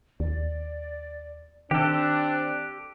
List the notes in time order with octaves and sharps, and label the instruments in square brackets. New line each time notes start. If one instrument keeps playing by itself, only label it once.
[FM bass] D#2 [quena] D5
[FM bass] D#3 [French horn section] C4 D4 [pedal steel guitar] G4 A4 [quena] F#6